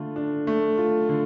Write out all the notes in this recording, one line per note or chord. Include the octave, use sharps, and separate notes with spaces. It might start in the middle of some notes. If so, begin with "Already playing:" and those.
Already playing: D3 A3 F4
D4
A3
F4
D3